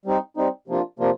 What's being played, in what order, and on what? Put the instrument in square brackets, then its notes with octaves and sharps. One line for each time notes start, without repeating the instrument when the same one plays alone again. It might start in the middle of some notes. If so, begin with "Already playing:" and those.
[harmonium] G3 C4 D#4
G3 C4 D#4
C3 F3 A#3 D4 F4
C3 F3 A#3 D4 F4